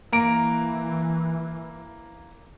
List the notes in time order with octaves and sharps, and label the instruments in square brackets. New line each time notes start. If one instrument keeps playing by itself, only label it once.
[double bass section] E3 [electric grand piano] A#3 A#5 D7